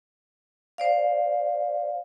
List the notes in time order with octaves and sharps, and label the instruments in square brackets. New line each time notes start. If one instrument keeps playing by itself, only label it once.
[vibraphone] C5 D5 F5